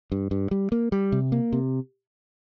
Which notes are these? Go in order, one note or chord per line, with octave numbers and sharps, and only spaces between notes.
G2
G2
G3
A#3
G3
C3
A#3
C3